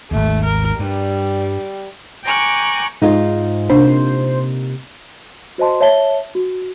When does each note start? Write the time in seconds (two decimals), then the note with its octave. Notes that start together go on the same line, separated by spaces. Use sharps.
0.11 G#1 D#2 A3
0.44 A#4
0.79 G2 G3
2.24 G5 G#5 A#5 C#6 D6 F#6
3.02 G#2 D#4 F4
3.70 C3 A#3 D4 C5
5.58 F#4 C5 D#5 A5 C6
5.80 C#5 E5 A5 G7
6.35 F#4